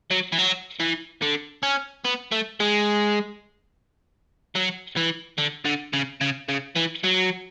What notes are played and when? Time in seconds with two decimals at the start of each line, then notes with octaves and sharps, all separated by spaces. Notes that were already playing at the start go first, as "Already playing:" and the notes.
0.11 F#3
0.32 E3
0.39 F#3
0.80 E3
1.22 D3
1.63 C#4
2.05 B3
2.32 A3
2.60 G#3
4.55 F#3
4.96 E3
5.38 D3
5.65 D3
5.93 C#3
6.21 C#3
6.49 C#3
6.76 E3
7.04 F#3